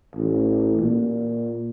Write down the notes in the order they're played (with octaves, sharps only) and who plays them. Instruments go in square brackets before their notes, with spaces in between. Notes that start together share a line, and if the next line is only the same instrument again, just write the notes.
[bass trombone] A1
A#2